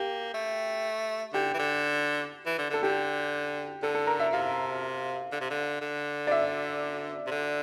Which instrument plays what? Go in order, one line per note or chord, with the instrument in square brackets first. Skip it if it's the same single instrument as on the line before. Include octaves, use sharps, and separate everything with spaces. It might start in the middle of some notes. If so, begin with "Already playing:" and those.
Already playing: [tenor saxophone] A#3 [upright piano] G4
[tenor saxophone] A3
[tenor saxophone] D3 [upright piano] G4
[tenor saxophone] E3
D3
E3
D3
[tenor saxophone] D3 [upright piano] A4
[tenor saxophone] D3 [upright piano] G4
[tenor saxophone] D3 [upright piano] A4
[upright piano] A4
A#4
E5
[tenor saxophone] C3 [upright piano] F5
[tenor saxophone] D3
C3
D3
D3
[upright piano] D5
E5
[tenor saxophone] C3
D3